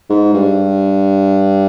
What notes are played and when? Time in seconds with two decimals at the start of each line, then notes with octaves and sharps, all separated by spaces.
0.10 G#2
0.34 G2